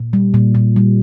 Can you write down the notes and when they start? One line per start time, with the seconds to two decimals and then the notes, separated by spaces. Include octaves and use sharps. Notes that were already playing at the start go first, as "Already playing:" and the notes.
Already playing: A#2
0.13 G3
0.34 A#2
0.55 A#2
0.76 G3